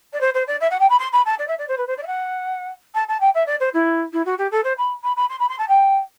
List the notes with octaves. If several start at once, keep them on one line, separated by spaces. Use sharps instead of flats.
D5
C5
C5
D5
E5
F#5
G5
B5
C6
B5
A5
D5
E5
D5
C5
B4
C5
D5
E5
F#5
A5
A5
G5
E5
D5
C5
E4
E4
F#4
G4
A4
C5
B5
B5
B5
C6
B5
C6
A5
G5